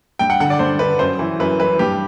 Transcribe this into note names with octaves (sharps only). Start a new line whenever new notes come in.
G2 G5
F#5
D3 F#5
D5
G2 C5
D3 B4
F#2 C5
E3
F#2 B4
E3 B4
G2 G4